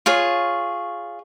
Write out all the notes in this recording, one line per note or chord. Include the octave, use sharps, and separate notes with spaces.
F4 G#4 C#5